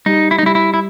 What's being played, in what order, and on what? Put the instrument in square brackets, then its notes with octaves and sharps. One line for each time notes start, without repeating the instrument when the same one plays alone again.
[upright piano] G3 [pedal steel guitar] D#4
[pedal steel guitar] E4
D#4
[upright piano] G3 [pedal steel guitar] E4
[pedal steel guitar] E4
E4